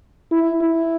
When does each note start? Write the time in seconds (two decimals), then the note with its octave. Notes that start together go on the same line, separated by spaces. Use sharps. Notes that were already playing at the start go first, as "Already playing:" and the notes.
0.32 E4
0.61 E4